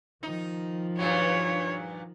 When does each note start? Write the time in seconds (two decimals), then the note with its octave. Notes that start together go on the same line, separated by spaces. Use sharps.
0.23 D#3 F3 D#4
0.99 G2 A#2 F#3 C#5